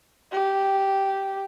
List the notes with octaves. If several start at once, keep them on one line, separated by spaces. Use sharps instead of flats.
G4